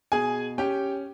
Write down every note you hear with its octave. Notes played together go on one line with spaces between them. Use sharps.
B2 G#4 G#5
C#4 G4 G5